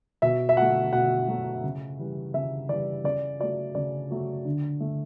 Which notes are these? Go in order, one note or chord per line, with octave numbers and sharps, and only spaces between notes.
B2 E5
E5
F#3 A3 F#5
B2 F#5
F#3 A3
C#3
E3 G3
C#3 E5
E3 G3 D5
C#3 D5
F#3 A3 D5
C#3 D5
F#3 A3
D3
A3